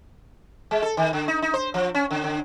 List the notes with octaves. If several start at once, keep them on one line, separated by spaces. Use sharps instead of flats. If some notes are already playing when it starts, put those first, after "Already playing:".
G#3
A4
D#3
D3
D#4
D#4
C5
F3
C#4
D3
D3